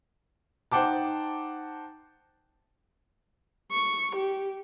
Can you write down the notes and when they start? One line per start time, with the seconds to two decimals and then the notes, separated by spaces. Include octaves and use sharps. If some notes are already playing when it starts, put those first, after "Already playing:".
0.72 D#4 C5 F#5 G5 A5 D6
3.71 C#6
4.16 G4